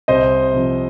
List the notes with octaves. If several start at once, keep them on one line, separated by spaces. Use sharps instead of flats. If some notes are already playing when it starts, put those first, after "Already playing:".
C2 C5 D#5
C3 F3